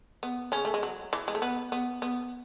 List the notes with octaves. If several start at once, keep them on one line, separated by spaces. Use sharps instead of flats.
B3
C#3 C#4
A3
G#3
F#3
E3
G#3
A3
B3
B3
B3